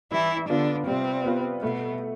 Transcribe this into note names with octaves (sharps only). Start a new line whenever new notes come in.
E3 G3 E4
D3 B3 D4 F4 B4
C3 G3 C4
B3 F4 B4
B2 A3 B3